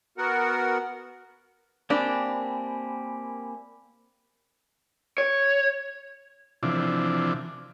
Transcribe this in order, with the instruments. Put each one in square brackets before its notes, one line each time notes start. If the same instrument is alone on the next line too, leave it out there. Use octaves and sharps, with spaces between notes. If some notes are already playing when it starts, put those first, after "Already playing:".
[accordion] B3 F#4 A#4 F#5
[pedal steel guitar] A#3 C4 G4 [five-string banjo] D4 [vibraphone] G#5 B5
[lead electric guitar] C#5
[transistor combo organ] C3 E3 F3 D4